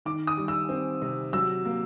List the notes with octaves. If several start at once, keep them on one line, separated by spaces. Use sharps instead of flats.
D#3 D6
D#6
G3
E6
C4
C3
F#3 E6
A#3